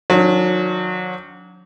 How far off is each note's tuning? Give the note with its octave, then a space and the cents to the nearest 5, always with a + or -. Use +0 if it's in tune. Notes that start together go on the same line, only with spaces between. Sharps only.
D#3 -5 F#3 -30 D4 -40